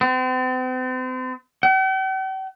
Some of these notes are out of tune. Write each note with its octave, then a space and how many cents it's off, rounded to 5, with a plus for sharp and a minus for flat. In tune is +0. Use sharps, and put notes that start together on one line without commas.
C4 -40
G5 -45